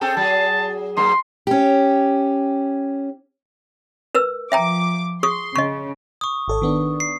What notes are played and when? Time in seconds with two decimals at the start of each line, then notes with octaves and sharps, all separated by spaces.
0.01 C4 G#4 A4 G5
0.17 F#3 G#4 A5
0.97 G#2 F#3 A#3 C6
1.47 C#4 G4
4.15 A#4 B4 E6
4.52 F3 E5 G5 A#5 D6
5.23 G#4 C6 C#6 D#6
5.56 C#3 D#5 C#6
6.21 C#6 D#6
6.48 G#1 A4 C#5
6.62 D#3 B3 D4
7.00 C7